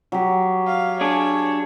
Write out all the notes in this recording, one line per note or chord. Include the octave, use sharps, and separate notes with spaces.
F#3 G4
F5
D4 G#4 C#5